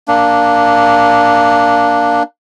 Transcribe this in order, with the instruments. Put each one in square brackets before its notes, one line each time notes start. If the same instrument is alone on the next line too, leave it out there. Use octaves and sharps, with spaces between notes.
[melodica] A#3 D4